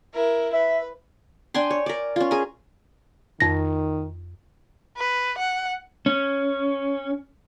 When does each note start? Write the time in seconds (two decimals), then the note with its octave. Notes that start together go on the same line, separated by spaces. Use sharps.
0.13 E4 A#4
0.53 B4 E5
1.54 D4 G5 G#5 C6
1.71 C#5
1.86 A#4 D5
2.16 C#4 F4
2.31 G#4 A#4 G#5
3.40 F2 D#3 A#6
4.97 B4
5.38 F#5
6.06 C#4